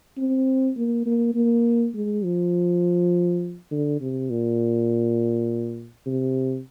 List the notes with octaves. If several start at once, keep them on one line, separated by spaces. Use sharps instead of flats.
C4
A#3
A#3
A#3
G#3
F3
D3
C3
A#2
C3